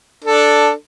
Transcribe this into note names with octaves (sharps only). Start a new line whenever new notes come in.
D4 A4